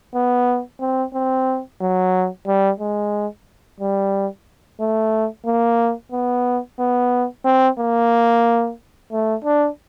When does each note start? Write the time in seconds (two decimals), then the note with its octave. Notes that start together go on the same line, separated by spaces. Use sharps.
0.14 B3
0.80 C4
1.14 C4
1.81 F#3
2.47 G3
2.80 G#3
3.80 G3
4.80 A3
5.46 A#3
6.12 B3
6.79 B3
7.45 C4
7.79 A#3
9.12 A3
9.45 D4